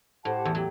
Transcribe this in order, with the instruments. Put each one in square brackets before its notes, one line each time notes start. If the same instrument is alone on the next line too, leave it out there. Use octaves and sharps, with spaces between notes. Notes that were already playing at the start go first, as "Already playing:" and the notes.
[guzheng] A2 [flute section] G4 C5 F#5 A5
[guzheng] E2 E3
[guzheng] F#3 [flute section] G4